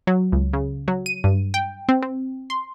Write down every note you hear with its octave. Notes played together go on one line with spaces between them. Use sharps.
F#3
C#2
C#3
F#3
D#7
G2
G5
C4
C4
C6